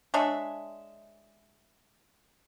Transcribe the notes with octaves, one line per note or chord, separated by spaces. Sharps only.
G#3 D4 C#5 E5